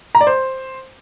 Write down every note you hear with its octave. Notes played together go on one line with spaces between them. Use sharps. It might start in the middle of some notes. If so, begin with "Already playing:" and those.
A#5
D5
C5